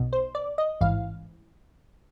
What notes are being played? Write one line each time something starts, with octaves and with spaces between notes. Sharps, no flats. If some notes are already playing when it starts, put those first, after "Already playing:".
Already playing: B1 B2
C5
D5
D#5
A1 G#2 E3 F5